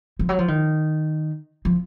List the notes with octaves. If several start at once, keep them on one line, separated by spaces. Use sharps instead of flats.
F3
F#3
F3
D#3
F3